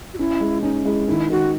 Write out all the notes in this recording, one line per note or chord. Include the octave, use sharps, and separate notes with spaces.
F#4
C#4 E4
G#3
C#4 D#4
G#3 E4
D#3 E4
D#3 F#4